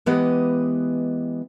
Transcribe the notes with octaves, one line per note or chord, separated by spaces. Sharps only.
E3 G#3 B3 G4 B4 D#5